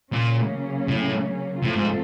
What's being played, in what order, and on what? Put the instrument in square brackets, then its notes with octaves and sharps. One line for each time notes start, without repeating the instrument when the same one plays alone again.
[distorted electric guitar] A#2 [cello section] C#3 F#3 A#3 C#4
[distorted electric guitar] A2
[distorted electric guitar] A2 [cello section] F3 A3 C4 F4 A4
[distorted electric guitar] G#2